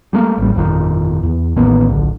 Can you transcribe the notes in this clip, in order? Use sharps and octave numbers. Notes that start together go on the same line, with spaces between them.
G3 A3 A#3
A1 G3
G1 F2 A#2 D#3
E2
A1 D#3 A#3 B3
D1 A#1 D3